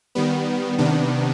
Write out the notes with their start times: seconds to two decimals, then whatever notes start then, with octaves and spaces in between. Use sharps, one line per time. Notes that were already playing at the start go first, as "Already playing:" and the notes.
0.15 D#3 G3 B3
0.78 C3 D#3 B3 D4